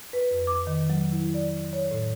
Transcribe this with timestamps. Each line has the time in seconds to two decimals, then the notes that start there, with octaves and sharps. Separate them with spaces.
0.13 B4
0.31 F2
0.47 D6
0.67 D#3
0.90 F#3
1.12 E4
1.34 D5
1.73 C#5
1.91 A2